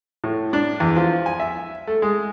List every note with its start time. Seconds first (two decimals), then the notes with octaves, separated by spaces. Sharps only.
0.24 A2
0.53 D4
0.80 E2
0.96 F3
1.26 G#5
1.40 E5
1.87 A3
2.02 G#3